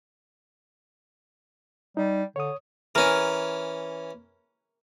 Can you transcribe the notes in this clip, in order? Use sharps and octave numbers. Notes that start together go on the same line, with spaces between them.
G3 D#4
D3 C#5 D#6
E3 C#4 A#4 G#5